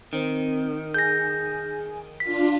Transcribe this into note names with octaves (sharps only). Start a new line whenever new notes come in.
D#3 C4
G#4 G6 A#6
D4 F4 B6